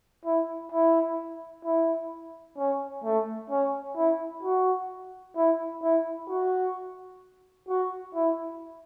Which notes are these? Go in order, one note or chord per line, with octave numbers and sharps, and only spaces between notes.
E4
E4
E4
C#4
A3
C#4
E4
F#4
E4
E4
F#4
F#4
E4